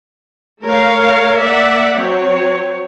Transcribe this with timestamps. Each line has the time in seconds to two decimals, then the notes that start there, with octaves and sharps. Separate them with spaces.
0.64 A3 A#4 C#5 F5
1.38 A#3 D5 E5 F#5
1.97 F#3 C4 C#5